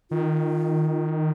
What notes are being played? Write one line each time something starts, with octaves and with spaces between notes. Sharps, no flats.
D#3 F4